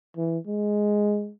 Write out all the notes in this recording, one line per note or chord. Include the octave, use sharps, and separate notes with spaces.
E3
G#3